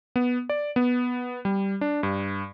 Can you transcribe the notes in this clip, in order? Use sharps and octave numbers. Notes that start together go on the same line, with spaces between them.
B3
D5
B3
G3
D4
G2